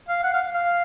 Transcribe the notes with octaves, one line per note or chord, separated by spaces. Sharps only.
F5
F#5
F5
F5